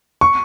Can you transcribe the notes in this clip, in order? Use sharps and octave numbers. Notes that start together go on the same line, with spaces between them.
C#6